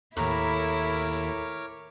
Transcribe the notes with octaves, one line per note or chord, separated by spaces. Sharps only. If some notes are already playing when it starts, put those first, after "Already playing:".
D#2 A2 D#3 E4 A#4 C#5 A#5 D6